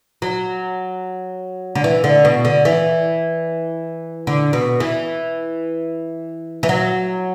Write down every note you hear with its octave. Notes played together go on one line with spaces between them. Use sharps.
F#3
D3
E3
D3
B2
D3
E3
D3
B2
E3
E3
F#3